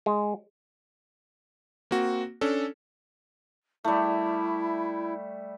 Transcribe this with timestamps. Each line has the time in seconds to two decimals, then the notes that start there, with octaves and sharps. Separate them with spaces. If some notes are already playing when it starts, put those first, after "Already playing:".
0.06 G#3
1.91 A#3 C4 F#4
2.41 C#4 D4 A4
3.84 G3 A3 E4